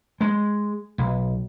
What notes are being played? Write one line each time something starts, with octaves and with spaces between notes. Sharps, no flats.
G#3
B1